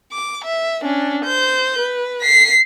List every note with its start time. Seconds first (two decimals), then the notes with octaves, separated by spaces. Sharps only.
0.13 D6
0.45 E5
0.83 C#4 D4
1.25 C5 G6
1.78 B4
2.22 B6 C7